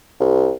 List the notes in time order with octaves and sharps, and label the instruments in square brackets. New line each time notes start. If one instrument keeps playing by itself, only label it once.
[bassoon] C2